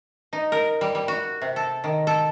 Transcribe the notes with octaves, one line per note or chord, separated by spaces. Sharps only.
D#4
A#4
G3
G3
F#4
C3
A4
D#3
A4